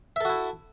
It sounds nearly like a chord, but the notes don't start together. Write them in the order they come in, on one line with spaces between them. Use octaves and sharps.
E5 A4 F#4 E4